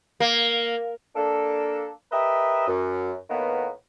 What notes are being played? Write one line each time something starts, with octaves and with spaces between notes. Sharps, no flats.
A#3
A#3 D4 A4
G4 A#4 B4 D#5 E5
F#2
A2 D#3 A#3 B3